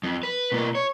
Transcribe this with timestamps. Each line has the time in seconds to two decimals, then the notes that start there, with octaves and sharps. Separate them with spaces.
0.03 F2
0.23 B4
0.52 B2 A#3
0.75 C#5